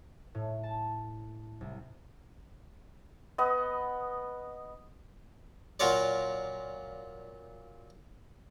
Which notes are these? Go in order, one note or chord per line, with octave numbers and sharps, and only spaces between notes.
A2
A5
C2
B3 D#5
A#2 F#3 F4 C#5 D5